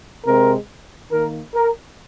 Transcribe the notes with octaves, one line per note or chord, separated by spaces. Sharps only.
C3 G#3 C4 A#4
D#3 A#3 A#4
A#4